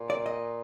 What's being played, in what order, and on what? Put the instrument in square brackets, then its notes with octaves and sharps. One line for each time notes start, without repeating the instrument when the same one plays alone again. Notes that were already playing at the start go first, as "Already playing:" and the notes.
Already playing: [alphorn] A#2
[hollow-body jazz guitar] D5
D#5